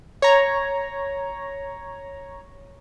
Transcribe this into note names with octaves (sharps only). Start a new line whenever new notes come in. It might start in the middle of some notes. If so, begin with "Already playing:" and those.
C#5 A#5